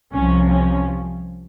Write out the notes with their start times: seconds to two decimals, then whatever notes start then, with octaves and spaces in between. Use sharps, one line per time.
0.13 C2 C3 F3 C#4
0.50 C#4